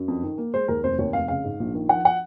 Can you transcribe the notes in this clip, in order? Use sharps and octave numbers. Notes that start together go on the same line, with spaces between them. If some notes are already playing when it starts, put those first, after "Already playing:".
Already playing: F#2
F2
D#3
A#3
G#3 C5
D#2 A#4
F1 C5
D#2 C#5
F1 F5
C#3 F5
G#2
A#1
D#3
F3 F#5
F#5